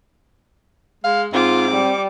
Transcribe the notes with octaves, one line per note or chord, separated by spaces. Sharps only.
G#3 F5
G#2 C4 F4 D6
G3